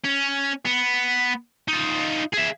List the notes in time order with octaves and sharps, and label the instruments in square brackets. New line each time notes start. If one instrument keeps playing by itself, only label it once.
[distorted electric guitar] C#4
B3
D#4 F4
G#4 E5